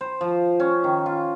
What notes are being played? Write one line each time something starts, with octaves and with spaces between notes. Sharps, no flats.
C5
F3
C#4
D#3
F4